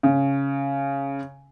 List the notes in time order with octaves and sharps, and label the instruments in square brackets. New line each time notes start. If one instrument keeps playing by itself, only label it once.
[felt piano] C#3